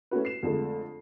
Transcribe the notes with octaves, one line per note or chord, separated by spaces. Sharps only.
A3 C#4 E4 F#4 B4
C7 E7
F2 D3 G#3 A3